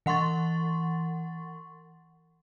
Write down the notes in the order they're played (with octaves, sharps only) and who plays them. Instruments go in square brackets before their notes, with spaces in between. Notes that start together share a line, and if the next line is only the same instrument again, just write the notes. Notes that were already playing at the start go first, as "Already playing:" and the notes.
[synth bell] E3 F#5 C6 C#6 A6